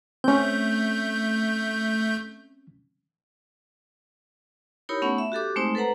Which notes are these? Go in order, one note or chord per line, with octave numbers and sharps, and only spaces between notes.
A3 C4 C#4 G6
D#4 E4 G4 A#4 C#5 B5
A3 B3 C#4 D#4 F#5 B5
E5
F#4 G4 A4 D6
G#3 A3 C4 D#4 C5
A4 B4 C5 F#5 A#5